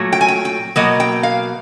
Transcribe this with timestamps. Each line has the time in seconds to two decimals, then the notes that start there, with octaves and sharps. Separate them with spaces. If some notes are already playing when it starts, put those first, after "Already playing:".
Already playing: A#2 F#3 A3
0.13 G5
0.21 G#5
0.28 G5
0.45 G5
0.76 B2 F#3 A#3 D#5
1.00 G5
1.23 F5